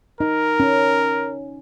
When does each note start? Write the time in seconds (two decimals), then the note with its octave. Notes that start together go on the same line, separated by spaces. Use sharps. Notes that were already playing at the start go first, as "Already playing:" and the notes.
0.20 D#4 A#4
0.60 C#4